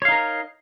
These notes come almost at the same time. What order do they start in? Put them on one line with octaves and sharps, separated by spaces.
C#5 F5 D#4 A#4